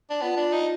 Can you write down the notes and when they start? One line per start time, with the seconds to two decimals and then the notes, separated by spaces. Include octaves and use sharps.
0.10 D4
0.22 B3 F4
0.37 D4
0.53 D#4